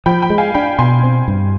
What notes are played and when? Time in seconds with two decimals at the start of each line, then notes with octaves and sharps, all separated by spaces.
0.06 F3 G5 B5
0.22 G5 B5
0.30 G#3
0.38 F5 G#5
0.54 D4 G5 B5
0.79 B2 G#5 C6
1.03 C4
1.28 G2